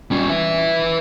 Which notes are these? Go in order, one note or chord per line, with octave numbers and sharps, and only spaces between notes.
G3 C#4
B4 E5